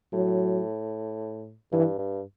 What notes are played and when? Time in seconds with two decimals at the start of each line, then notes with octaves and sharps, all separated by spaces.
0.13 A2 F#3
1.72 G2 E3
1.98 G2